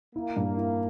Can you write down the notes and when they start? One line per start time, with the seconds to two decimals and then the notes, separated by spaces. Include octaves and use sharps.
0.15 A#3 E4
0.37 G2
0.57 E4